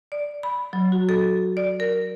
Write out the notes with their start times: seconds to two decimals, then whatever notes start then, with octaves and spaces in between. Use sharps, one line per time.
0.12 D5
0.43 B5
0.73 F#3
0.92 F#4
1.09 A4
1.57 D5
1.80 A#4